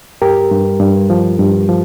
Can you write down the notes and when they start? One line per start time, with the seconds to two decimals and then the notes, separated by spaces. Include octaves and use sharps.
0.22 G2 G4 A#4
0.51 G2
0.80 G2
1.10 F3
1.39 G2
1.69 F3